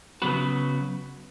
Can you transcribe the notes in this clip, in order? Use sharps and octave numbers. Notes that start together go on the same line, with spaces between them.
C#3 F#3 B3 F#4 B4